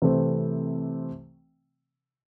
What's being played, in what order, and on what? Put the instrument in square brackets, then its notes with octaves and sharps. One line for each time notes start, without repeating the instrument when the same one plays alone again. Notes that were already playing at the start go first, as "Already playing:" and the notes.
[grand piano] C3 E3 A3 C4